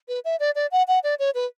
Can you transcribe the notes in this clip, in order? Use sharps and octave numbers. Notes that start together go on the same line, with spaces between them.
B4
E5
D5
D5
F#5
F#5
D5
C#5
B4